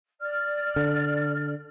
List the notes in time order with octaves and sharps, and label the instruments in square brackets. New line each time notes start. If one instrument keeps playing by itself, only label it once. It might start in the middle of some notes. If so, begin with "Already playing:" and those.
[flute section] D5 F6
[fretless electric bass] D3